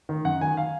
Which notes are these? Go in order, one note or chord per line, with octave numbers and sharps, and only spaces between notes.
D#3
F#2 F#5
D#3 G#5
F5